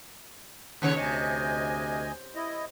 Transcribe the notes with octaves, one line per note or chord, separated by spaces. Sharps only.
D#2 C#3 C#5
D2 C3 D#5 G#5
E4 D#5